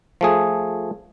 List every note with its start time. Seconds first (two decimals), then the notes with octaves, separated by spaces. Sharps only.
0.21 F3 A3 G#4